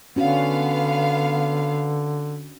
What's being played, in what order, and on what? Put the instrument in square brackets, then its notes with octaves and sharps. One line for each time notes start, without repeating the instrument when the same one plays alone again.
[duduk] D3 [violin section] B3 F5 [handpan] C#4 D4 F#4